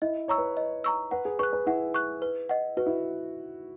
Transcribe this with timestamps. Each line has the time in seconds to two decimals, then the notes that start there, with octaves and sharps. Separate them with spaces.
0.02 E4 D#5
0.28 C#5 A#5 C#6 E6
0.38 B4
0.57 D#5
0.84 A#5 C#6 E6
1.11 B4 F#5
1.25 G#4
1.39 B4 C#6 F#6
1.53 B4
1.66 E4 F#5
1.94 C#6 F#6
2.22 B4
2.49 D#5 F#5
2.77 F#4 B4
2.86 E4